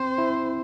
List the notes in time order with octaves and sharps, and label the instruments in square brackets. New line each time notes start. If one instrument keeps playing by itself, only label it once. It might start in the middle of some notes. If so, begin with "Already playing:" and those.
Already playing: [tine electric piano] C4 [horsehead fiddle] C5
[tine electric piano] E4